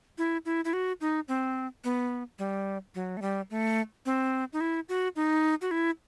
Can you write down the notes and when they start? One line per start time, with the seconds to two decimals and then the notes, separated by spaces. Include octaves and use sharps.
0.18 E4
0.45 E4
0.65 E4
0.73 F#4
1.01 D#4
1.28 C4
1.84 B3
2.39 G3
2.95 F#3
3.17 A3
3.22 G3
3.51 A3
4.06 C4
4.53 D#4
4.61 E4
4.89 F#4
5.16 D#4
5.62 F#4
5.71 E4